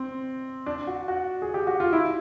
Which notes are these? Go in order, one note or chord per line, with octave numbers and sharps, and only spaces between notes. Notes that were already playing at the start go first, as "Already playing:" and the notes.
Already playing: C4
D4
F#4
F#4
G#4
G4
F#4
F4
E4